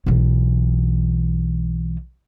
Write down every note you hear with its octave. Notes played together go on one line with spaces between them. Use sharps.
B1 E3